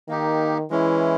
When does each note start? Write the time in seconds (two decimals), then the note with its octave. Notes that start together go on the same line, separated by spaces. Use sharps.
0.08 D#3 A#3 D#4 G4
0.70 E3 G#3 C#4 E4